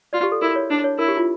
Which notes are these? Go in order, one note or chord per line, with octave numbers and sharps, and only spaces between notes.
F4 D5
G4
A4
E4 A#4
C#5
D4
C#5
E4 A#4
G4
F4